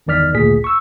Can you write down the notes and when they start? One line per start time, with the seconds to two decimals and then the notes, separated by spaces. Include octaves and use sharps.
0.07 G1 E2 D#3 D5 F6 B6
0.34 G#1 D2 A#2 G#4 B6
0.64 C#6 E6